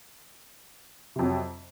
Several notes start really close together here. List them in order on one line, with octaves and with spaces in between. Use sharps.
C3 F2 F#3